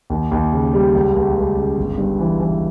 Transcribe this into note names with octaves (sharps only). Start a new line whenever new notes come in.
D#2
D#2
C#3
G3
C#2
C#2
C#2
C#3
G1
G2
E3
E3